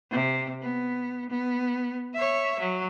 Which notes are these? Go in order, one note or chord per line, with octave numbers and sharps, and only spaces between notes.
C3
B3
B3
C#5 E5
F#3